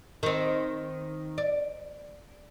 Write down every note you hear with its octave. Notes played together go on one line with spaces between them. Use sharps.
D#3 C4
D5